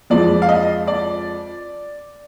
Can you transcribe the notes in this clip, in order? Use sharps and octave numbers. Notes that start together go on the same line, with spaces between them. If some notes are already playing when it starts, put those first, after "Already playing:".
F2 F3 G#3 D5
F5
D#5
D5